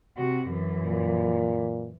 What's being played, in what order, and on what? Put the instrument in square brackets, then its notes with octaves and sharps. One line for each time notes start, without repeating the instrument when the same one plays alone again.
[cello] C3 F#4
F#2 E3
[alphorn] A#2